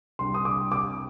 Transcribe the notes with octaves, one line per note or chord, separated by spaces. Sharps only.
C2 C3 G3 D4 C6
D#6
D6
D6